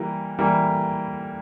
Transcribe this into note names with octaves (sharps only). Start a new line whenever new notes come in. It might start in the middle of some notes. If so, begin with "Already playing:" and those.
Already playing: E3 G3 A#3
E3 G3 A#3